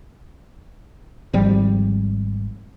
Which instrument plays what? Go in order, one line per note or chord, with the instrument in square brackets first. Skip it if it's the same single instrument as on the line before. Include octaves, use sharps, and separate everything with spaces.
[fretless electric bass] G#1 F3 G3